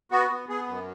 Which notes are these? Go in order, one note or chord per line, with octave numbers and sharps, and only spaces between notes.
B3 F#4
B3
B3 G#4
F#2